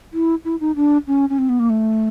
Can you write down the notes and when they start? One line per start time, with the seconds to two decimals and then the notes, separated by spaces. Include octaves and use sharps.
0.13 E4
0.45 E4
0.61 D#4
0.76 D4
1.07 C#4
1.29 C#4
1.38 C4
1.49 B3
1.60 A#3
1.70 A3